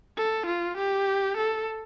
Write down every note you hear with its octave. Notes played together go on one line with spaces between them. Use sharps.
A4
F4
G4
A4